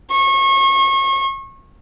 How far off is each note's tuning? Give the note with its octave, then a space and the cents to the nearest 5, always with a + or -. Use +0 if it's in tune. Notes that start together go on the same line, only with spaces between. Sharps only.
C#6 -30